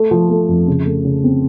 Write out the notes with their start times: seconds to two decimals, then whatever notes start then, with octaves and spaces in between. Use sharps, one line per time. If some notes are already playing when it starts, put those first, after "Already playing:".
Already playing: A3
0.11 F3
0.30 A3
0.49 F2
0.68 C#3
0.86 A3
1.05 C#3
1.24 C4